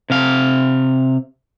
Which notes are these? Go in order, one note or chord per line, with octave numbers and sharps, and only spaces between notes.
C3 F5